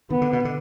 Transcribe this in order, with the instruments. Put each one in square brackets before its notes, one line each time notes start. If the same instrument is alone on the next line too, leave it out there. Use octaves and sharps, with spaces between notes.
[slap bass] D#3 [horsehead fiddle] B3
[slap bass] D3
B2
D3